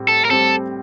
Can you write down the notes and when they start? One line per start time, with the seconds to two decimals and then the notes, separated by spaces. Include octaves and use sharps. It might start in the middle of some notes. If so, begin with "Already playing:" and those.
Already playing: A2 G3 C4
0.08 A4
0.25 A#4
0.30 G3 C4 A4